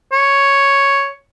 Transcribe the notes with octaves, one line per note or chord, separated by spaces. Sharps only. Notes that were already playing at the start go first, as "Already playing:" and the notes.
C#5